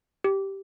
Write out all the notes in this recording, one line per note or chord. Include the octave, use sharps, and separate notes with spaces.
G4